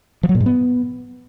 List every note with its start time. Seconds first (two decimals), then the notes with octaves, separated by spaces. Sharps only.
0.23 F3
0.29 F#3
0.35 A#2
0.40 G#2
0.46 B3